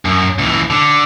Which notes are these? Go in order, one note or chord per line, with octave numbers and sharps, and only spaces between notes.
F#2
C#2 E3
D3